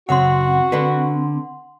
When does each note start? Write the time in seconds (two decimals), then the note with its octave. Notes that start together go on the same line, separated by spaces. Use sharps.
0.09 F#2 C#3 C4 F#4 C#5 F#5 C6
0.72 D3 D4 B4